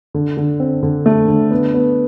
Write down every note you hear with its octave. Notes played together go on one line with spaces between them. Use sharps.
D3
D3
C4
D3
A3
D3
B3
B3